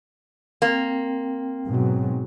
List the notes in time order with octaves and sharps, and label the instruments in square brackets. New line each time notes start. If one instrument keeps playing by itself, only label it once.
[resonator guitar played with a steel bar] A#3 [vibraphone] C4 G5
[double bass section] G#2 B2 F#3